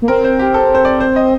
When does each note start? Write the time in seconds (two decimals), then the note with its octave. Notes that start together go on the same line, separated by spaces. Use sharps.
0.02 A#3
0.08 C4 A#4
0.24 C5
0.39 G4
0.54 A4
0.75 C5
0.85 D5
1.00 C5
1.16 D#5